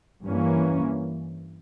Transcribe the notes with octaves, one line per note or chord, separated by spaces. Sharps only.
G2 E3 A#3 C#4